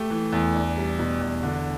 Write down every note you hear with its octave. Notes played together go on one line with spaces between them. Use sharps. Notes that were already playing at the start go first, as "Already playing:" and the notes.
Already playing: A3 G4
E3
E2
D4
G3
B2
E2
D3